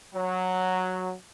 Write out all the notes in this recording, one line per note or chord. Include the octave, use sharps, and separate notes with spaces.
F#3